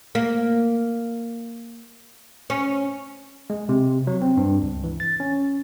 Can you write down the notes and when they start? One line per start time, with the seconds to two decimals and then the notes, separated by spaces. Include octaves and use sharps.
0.15 A#3
2.50 C#4
3.50 G#3
3.69 C3
4.07 F#3
4.22 C4
4.37 G2
4.62 C#2
4.84 E3
5.00 A6
5.20 C#4